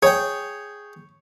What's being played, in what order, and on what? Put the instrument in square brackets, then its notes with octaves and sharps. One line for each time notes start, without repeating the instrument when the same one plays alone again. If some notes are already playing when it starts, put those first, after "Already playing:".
[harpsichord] G#4 G5 [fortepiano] C#5